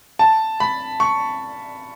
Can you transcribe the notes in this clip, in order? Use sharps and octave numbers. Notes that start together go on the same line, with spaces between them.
A5
B5
C#6